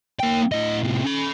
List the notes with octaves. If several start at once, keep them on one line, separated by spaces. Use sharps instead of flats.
A#3 G5
A2 D#5
A2 C3
C#4 B5